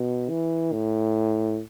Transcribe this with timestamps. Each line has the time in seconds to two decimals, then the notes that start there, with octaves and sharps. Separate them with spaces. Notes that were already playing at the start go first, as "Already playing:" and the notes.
Already playing: B2
0.30 E3
0.72 A2